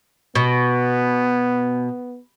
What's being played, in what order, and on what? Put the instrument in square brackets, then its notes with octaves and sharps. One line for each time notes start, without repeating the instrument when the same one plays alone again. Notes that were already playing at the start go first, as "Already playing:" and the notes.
[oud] B2 [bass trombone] B3